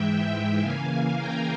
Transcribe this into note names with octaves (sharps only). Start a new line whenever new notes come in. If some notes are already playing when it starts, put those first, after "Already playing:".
Already playing: G#2 E3 G#3 E5 G5
C#3 E3 A#3 F5 G#5
G5 A#5